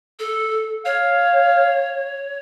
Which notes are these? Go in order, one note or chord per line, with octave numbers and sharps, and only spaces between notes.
A4
C#5 F5